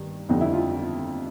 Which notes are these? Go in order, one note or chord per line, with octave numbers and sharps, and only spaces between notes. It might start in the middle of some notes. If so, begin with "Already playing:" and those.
Already playing: G2 D#3
F2 D3 G3 D#4
E4
F4